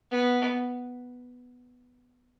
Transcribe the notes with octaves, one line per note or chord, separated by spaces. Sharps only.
B3